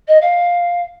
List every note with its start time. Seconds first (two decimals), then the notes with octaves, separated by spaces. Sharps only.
0.08 D#5
0.22 F5